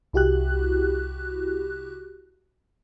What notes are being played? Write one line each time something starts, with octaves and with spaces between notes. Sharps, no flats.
C2 E4 F#4 G4 F#6